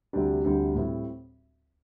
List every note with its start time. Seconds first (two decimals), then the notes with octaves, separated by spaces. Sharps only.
0.13 D2 C3 G3 D4 G4
0.44 D2 C3 G3 D4 G4
0.75 A2 G3 C4